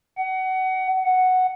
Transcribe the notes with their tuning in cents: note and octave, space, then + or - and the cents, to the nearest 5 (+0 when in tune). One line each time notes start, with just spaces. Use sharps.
F#5 +25
F#5 +0